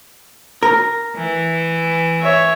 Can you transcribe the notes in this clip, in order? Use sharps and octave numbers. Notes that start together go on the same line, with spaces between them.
A#4
E3
C#5 E5